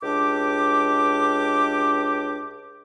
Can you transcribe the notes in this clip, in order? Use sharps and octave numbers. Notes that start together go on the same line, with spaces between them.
C#2 D4 G4 D6